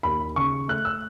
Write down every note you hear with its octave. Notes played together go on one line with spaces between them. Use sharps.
D#2 B5
C#3 C#6
A3 F#6
E6